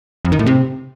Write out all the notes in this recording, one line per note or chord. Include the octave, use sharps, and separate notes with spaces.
F2
D#3
A2
C3